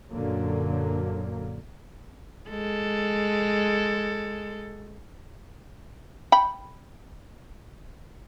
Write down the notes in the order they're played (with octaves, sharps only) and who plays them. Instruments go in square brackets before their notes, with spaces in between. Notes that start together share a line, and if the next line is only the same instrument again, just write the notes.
[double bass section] F#2 A#2 D3 F#3 A#3
[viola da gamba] G#3 A4
[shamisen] G5 B5